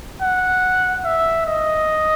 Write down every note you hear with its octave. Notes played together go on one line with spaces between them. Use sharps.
F#5
E5
D#5